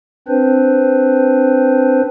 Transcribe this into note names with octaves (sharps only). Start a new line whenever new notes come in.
C4 D4 B4 C5